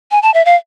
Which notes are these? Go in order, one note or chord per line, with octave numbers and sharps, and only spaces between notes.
G#5
A5
E5
F5